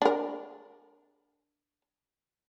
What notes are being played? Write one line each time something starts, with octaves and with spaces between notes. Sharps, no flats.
D4 A#4